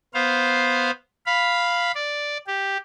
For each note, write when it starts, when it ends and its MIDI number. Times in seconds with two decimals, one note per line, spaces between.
0.14 0.91 59
0.14 0.91 72
0.14 0.91 77
1.26 1.92 77
1.26 1.92 83
1.95 2.38 74
2.47 2.77 67